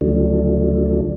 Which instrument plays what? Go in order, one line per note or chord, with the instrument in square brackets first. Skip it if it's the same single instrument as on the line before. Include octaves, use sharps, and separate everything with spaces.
[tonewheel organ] D2 C#3 F3 F#3 A3 D4